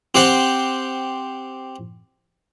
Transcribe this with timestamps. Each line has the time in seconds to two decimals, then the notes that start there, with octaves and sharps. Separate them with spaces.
0.15 C4 G4 C5 F#5